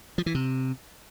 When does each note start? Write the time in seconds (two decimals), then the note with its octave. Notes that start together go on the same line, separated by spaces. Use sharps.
0.18 F3
0.26 E3
0.35 C3